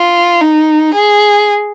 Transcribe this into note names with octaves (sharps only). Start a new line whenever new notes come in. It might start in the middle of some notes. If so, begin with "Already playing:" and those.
Already playing: F4
D#4
G#4